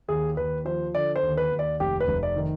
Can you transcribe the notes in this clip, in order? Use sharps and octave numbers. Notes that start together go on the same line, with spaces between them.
D#2 G#4
D#2 B4
F3 C5
D3 D5
C5
D#2
B4
D#2
D5
F1 G4
B4
F1
D5
D#3